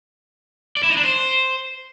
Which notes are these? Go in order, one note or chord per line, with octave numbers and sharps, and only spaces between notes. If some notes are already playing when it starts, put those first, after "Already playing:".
D5
E4
D#4
D4
C5